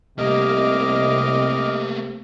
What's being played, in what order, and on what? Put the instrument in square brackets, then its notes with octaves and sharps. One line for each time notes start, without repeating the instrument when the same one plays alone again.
[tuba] C2 [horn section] C3 [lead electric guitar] A3 A#3 [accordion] D#5 D6 F6